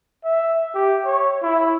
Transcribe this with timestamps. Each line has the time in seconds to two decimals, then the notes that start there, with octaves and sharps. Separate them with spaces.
0.24 E5
0.74 G4
1.05 C#5
1.43 E4